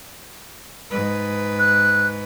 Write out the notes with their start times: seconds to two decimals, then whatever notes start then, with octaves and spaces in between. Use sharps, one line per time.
0.90 G#2 B4
1.59 F#6